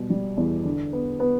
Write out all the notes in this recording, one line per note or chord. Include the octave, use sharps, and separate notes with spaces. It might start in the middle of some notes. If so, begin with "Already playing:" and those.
Already playing: B2 G3
G3
E2
D3
B3
B3